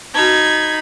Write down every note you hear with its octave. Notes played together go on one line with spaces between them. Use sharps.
D#4 F#4 A5 B5 G#6